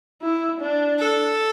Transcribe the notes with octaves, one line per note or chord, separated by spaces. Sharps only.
E4
D4
A4